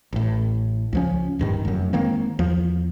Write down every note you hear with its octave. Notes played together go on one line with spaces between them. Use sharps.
A1 A2
C#2 F3 C#4
D1 G2 D#3
F1 F#2
D#3 G#3 A#3 C4
E2 F3